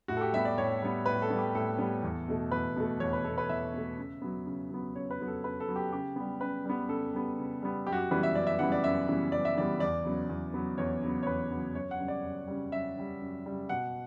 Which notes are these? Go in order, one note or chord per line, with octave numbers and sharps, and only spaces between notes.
A2 F#4
A4
G4
G3 B3 E5
D5
A2 C#5
G3 B3
A2 B4
A4
G3 B3
G4
A2 A4
G3 B3
E2
B2 A3
E2 B4
B2 A3
E2 C#5
B4
B2 A3 A4
B4
E2 E5
B2 A3
C#3
F#3 B3
C#3
F#3 B3
C#3 C#5
B4
F#3 B3
A4
C#3 B4
A4
F#3 B3
G4
C#3 G4
G3 B3
C#3 B4
G3 B3
C#3 A4
G3 B3
C#3
G3 B3
F#2 G4
F#4
G4
C#3 E3 G3 B3 B4
E5
F#2 D5
E5
C#3 E3 G3 B3 F#5
D5
F#2 E5
C#3 E3 G3 B3
F#2 D5
E5
C#3 E3 G3 B3 D5
E2 D5
C#3 F#3 B3
E2
C#3 F#3 B3
E2 C#5
C#3 F#3 B3
C#5
E2 B4
C#3 F#3 B3
F#2 C#5
F#5
C#3 G3
D5
F#2
C#3 G3
F#2 E5
C#3 G3
F#2
C#3 G3
B2 F#5